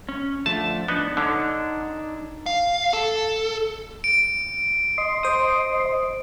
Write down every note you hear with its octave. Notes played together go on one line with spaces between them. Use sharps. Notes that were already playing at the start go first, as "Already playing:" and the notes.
C#4
D3 F3 A3 A5
B3 D4 D#4
D3 D4 D#4 C#5
F5
A4
D7
D#5 C6
C5 D#6